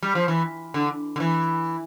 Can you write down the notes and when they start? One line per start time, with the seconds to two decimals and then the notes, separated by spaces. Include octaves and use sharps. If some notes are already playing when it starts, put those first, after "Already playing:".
0.03 G3
0.15 F3
0.28 E3
0.74 D3
1.16 D3
1.20 E3